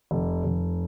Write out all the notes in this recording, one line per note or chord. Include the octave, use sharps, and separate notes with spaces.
F1
F1